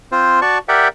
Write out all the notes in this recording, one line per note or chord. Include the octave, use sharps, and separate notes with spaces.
C4 F4 C5
F#4 D5 A5 C#6
G4 A#4 D5 E5 F#5 G5